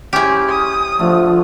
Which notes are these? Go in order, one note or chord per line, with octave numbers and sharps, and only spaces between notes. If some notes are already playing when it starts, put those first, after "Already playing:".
C#4 E4 G4 G#4 C5
D#6
D3 F3 A3